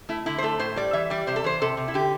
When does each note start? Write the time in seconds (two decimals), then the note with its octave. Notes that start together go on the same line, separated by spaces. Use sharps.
0.09 A3 E4
0.26 D3 E4
0.38 C5
0.43 A3 A4
0.59 A2 C5
0.76 G3 D5
0.93 E3 E5
1.10 G3 D5
1.27 C3 C5
1.36 A4
1.44 E3 C5
1.61 C3 A4
1.77 C3
1.88 E4
1.94 D3 G4